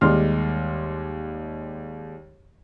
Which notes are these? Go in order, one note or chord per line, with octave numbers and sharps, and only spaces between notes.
D#2 G3 G#3 D5 C6 F6